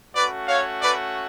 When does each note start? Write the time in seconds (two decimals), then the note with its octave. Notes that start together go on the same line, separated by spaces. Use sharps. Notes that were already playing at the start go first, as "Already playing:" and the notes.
0.15 A3 C#4 F#4 B4 D5
0.48 C#5 F5
0.81 B4 D5